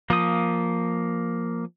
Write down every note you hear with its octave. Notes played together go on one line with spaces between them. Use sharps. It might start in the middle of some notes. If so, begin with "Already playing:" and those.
F3 A#3 D#6